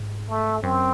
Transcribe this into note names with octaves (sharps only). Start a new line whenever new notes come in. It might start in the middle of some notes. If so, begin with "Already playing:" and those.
Already playing: G#2
A3
F#2 C4